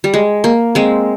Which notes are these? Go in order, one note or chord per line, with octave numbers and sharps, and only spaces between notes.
G3
G#3
A#3
G#3 C4